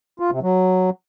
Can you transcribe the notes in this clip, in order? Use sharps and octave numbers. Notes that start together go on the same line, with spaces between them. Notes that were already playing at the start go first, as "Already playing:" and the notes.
F4
C3
F#3